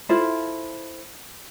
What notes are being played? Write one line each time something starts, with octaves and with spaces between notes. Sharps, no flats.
E4 F4 A4 C5